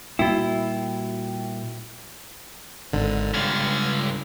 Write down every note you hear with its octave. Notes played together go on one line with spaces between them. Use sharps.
A#2 G3 A#3 E4 F#4 G5
G#1 D3
C#2 G2 D3 F6 G#6 A6